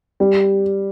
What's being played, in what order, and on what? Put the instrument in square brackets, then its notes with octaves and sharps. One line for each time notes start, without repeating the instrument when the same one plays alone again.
[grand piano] G3